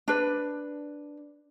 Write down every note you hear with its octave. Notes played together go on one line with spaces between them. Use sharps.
D4 B4